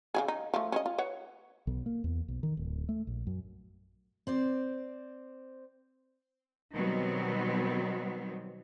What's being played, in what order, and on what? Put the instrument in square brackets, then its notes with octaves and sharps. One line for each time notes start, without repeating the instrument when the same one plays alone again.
[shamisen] C#3 F#3 G#4
D#4
F3 A3
C#4 C5 D#5
F4
B4 C#5 F#5
[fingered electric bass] B1
A#3
E2
B1
D#3
D1
A3
A#1
F#2
[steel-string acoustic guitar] C4 C5 D5
[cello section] B2 D#3 F#3 G3 B3 C4